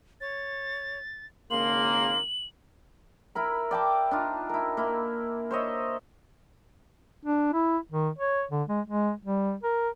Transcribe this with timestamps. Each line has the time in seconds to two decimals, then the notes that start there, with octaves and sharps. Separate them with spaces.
0.21 C#5 A6
1.50 G#1 C#3 A#3 C6 F#7
3.35 E4 A#4 B5
3.71 D5 G5 A5 D6
4.11 D4 D#4 F4
4.49 E4 A#4
4.77 A#3 E4
5.51 C5 C#5 D#5 E5
7.25 D4
7.54 E4
7.92 D#3
8.19 C#5
8.51 D3
8.68 G#3
8.88 G#3
9.25 G3
9.64 A#4